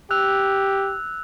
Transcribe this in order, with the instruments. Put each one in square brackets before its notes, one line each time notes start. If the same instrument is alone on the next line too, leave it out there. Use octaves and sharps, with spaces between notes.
[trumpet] G4 [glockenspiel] E6 F#6 F7